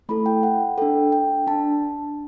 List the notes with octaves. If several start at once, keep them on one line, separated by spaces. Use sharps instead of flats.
A3 E4 A4 B5
G5
F#5
D4 A4 G5
G5
D4 A5